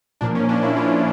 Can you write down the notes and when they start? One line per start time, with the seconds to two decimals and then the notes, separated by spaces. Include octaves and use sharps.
0.21 A#2 F3 A#3 D4
0.35 C#4
0.49 D4
0.63 E4
0.76 F4